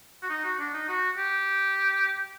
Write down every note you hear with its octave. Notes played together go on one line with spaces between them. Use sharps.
F#4
D#4
F#4
D4
D#4
F#4
G4